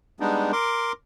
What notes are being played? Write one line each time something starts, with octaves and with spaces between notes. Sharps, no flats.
G3 G#3 B3 D4 D#4
A#4 C6 D6